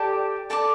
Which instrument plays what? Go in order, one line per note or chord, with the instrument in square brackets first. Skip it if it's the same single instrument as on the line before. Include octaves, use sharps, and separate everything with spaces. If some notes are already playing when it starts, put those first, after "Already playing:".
Already playing: [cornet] G4 [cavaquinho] A4 D5 A5
[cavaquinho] A4 D5 A5 D6